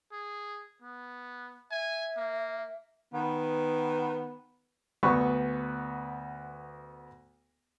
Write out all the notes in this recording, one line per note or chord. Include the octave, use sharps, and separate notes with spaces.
G#4
B3
E5 G#5
A#3
D#3 B3
D2 B3 B4 B5 C#6